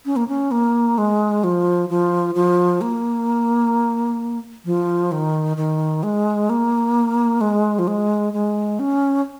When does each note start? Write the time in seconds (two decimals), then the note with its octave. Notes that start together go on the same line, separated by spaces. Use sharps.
0.06 C#4
0.16 A#3
0.28 C#4
0.51 A#3
0.98 G#3
1.44 F3
1.89 F3
2.35 F3
2.81 A#3
4.65 F3
5.12 D#3
5.57 D#3
6.03 G#3
6.50 A#3
7.41 G#3
7.79 F3
7.88 G#3
8.33 G#3
8.79 C#4